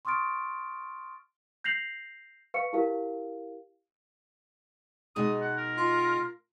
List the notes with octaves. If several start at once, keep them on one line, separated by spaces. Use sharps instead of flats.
C6 C#6 D#6 F6 A6 D7
G6 A#6 C7 F7 F#7
B4 F5 C#6 C#7
E4 G4 A#4 F5
B2 G#3 D#4 D#6
F#5
A#4
F4